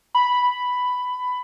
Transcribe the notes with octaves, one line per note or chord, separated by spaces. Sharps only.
B5